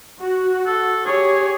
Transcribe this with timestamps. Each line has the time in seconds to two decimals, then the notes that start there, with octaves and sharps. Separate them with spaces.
0.19 F#4
0.67 A4
1.06 G4 G#4 C#5